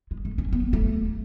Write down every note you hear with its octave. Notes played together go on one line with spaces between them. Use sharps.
G#3
A3
C#4
B3
A3